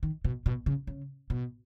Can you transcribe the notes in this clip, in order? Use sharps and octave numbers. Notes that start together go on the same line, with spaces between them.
D#3
B2
B2
C#3
C#3
B2